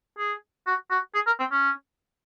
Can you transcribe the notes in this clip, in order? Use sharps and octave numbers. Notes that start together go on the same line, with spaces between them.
G#4
F#4
F#4
G#4
A#4
C4
C#4